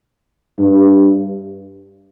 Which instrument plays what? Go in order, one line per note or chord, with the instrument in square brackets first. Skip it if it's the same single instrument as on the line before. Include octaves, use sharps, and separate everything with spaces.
[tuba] G2